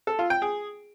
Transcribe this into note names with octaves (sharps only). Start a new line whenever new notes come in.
A4
F4
G5
G#4